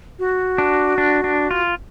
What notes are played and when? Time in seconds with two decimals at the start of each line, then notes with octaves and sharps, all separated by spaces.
0.19 F#4
0.58 D4
0.98 D4
1.24 D4
1.51 F4